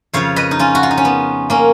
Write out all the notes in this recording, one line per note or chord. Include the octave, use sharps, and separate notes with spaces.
F2 C#3 F3 C#5 F5
B4 D#5
D#4
C#4 F4
F#4
F4
D#4
C#4
B3
A#3 C#4